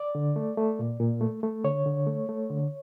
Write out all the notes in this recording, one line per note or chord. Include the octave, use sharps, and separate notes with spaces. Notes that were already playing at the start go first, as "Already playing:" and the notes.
Already playing: D5
D3
A3
A3
A#2
A#2
A3
A3
D3 C#5
D3
A3
A3
D3